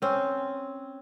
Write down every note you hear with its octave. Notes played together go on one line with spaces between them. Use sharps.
C4 C#4